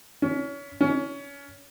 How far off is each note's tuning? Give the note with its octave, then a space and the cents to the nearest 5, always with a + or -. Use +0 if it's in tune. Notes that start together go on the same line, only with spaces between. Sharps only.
C#4 +30
C#4 +25